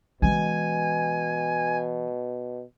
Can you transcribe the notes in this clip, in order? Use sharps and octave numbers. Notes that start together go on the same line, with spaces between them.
B2 E3 G#3 G#5